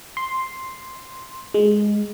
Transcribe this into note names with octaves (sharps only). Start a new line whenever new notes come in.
C6
G#3